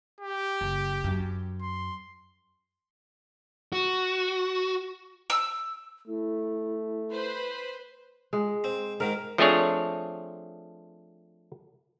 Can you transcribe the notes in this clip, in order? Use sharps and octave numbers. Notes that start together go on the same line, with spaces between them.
G4
F#1
F#2
C6
F#4
E6
A3 E4
B4 C5
G#3
C4
G#2 D#3 A#4
F3 A3 C4 D4 G#4 C#5